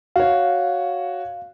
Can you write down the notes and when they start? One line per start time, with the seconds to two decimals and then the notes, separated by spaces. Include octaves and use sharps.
0.16 F#4 C#5 F5